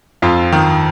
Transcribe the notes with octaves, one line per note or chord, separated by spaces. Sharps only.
F2 F4
D#3